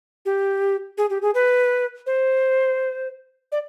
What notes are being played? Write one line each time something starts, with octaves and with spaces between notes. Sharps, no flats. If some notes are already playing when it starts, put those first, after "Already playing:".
G4
G#4
G4
G#4
B4
C5
D5